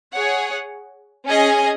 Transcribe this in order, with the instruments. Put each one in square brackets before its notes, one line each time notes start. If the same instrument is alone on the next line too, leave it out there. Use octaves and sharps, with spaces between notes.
[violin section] G#4 C#5 F#5
C#4 G#4 D#5 G#5